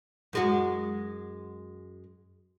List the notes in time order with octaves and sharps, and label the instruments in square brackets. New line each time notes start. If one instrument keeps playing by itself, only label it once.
[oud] F#2 G#3 F#4